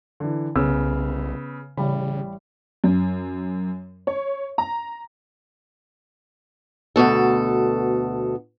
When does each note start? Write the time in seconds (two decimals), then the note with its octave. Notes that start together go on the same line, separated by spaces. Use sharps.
0.20 D3 E3
0.55 C2 C#3 B3 E6
1.77 A1 C#3 G3 B5
2.84 F#2
4.07 C#5
4.58 A#5
6.96 D2 G#2 B2 A4